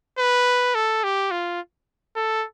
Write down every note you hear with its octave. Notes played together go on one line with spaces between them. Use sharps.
B4
A4
G4
F4
A4